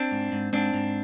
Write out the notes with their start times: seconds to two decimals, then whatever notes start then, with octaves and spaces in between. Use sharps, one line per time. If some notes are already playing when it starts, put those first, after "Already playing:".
Already playing: C4 D4
0.11 G#2
0.32 G#2
0.53 G#2 C4 D4
0.74 G#2